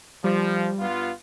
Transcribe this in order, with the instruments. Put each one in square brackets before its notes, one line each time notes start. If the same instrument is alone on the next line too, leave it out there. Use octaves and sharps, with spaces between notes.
[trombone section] F3 [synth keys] G3
[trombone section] G2 B3 F4